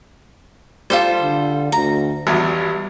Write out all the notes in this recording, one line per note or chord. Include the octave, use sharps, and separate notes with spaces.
G3 F4 A4 C5
D3
D2 A#5
G#1 E2 F#3 G3